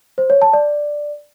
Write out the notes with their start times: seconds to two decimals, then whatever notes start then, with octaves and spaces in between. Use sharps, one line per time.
0.18 C5
0.30 C#5
0.42 A5
0.53 D5